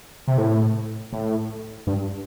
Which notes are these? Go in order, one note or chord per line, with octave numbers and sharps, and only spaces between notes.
C3
A2
A2
G2